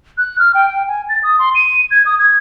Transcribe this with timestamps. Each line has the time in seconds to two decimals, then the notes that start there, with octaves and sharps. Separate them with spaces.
0.18 F#6
0.39 F6
0.54 G5
0.69 G5
0.88 G#5
1.09 A6
1.23 D#6
1.39 C6
1.55 D#7
1.91 G#6
2.05 D#6
2.19 G#6